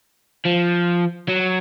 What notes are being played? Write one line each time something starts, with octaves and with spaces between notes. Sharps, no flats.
F3
F#3